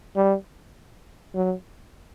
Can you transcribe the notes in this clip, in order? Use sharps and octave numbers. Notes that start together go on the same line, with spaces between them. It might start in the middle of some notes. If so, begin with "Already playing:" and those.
G3
F#3